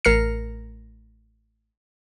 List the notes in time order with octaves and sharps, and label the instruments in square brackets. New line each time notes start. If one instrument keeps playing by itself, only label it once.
[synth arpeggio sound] A1 A#4 F6 C7 C#7